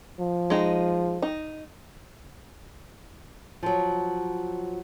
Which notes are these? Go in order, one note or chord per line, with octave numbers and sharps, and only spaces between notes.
F3
G#3 D#4
D#4
F3 F#3